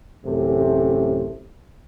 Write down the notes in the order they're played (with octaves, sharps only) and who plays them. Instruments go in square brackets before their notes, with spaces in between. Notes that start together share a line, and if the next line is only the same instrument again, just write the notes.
[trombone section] A1 F#2 C3 A3